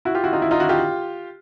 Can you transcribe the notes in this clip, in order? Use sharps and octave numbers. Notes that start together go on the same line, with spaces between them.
E4 F#4
F4 G4
E4 F#4
D#4 F4
E4
D#4 F4
E4 F#4
F4 G4